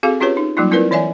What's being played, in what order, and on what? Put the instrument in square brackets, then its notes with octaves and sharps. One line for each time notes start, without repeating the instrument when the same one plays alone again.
[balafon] C4 F#4 G#4 A4 F5
C#4 F4 G4 G#4 B4 C#5
D#4
F#3 G3 A#3 D#4 F4
C4 E4 F4 A#4 B4 D5
E3 C#5 D5 E5 G#5